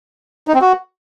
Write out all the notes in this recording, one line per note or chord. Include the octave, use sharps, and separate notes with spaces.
D#4
C4
F#4